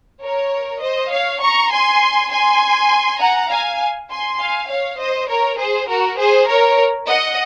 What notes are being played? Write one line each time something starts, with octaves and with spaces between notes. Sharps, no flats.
A#4 C#5
C5 D#5
C#5 F5
A#5 C#6
G#5 C6
G#5 C6
F#5 A#5
F5 G#5
G#5 C6
F5 G#5
C#5 F5
C5 D#5
A#4 C#5
G#4 C5
F#4 A#4
G#4 C5
A#4 C#5
D#5 F#5